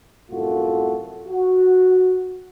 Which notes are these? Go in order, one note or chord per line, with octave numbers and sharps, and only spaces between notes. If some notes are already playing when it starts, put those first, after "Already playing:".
C2 F#2 A2 A3 F4 F#4
F#4